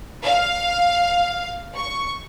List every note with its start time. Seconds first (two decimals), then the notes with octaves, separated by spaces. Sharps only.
0.24 F5
1.77 C#6